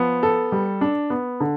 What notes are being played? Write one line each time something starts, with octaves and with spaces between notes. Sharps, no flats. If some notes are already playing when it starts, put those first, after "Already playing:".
Already playing: F3 B3
A4
G3
D4
B3
D3